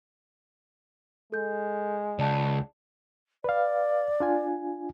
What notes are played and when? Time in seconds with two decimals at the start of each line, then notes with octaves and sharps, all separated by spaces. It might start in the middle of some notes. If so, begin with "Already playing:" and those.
1.32 G#3 A4 G6
2.19 C#2 D5 A5
3.44 B4 D5 F5
4.20 D4 F4 G#5